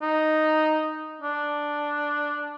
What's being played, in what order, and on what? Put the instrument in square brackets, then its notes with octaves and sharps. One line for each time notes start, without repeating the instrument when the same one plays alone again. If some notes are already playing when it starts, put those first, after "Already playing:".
[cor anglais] D#4
D4